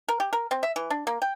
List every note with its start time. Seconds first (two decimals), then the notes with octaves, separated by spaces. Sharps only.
0.08 A#4
0.20 G4
0.33 A#4
0.51 C4
0.63 E5
0.76 E3
0.90 D4
1.07 A#3
1.22 G5